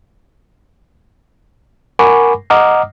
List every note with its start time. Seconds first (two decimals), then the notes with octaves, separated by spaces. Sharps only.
1.99 A#4 F#5 G#5 B5 C#6 D6
2.50 D#5 F#5 A#5 D6 D#6 F6